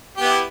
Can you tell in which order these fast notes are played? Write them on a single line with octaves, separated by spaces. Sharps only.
G4 B3 E4